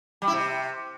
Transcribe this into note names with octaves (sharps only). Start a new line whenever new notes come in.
G3
E4
C3